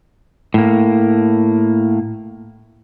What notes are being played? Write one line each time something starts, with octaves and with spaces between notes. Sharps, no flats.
A2 A#3